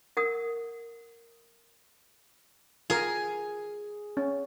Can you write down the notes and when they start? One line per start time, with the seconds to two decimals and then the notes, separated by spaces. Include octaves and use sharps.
0.17 A#4 F#5 D#6
2.90 F4 G#4 A#4
4.17 C#4